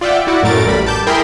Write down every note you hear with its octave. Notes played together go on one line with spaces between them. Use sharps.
F4 D5 E5 F#5 G5
E4 F#4 D5 F#5
F#2 A2 A3 A#4 A6 D7
A1 G3 B5
A5 D6 G6
E4 G#4 A#4 G5 B5 C6